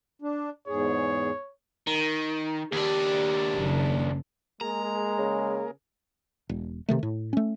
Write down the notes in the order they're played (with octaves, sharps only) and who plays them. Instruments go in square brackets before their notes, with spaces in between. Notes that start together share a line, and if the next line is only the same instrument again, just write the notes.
[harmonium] D4
[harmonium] E2 G#2 G#4 [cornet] C#5
[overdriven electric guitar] D#3
[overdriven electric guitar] D#2 D4 [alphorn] G4
[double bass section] F#1
[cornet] G#3 [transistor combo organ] A#3 G#4 A#4 [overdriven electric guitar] A#5
[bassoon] C#3
[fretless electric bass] E1
C3 D#3 A3
A2
A3 C#4